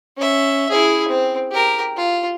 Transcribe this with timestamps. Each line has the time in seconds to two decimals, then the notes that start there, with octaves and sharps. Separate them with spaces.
0.17 C#4 E5
0.70 E4 G#4
1.08 C4
1.51 G4 A#4
1.97 F4